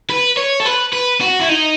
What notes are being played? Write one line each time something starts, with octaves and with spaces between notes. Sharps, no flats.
B4
C#5
A4
B4
B4
F#4
E4
D#4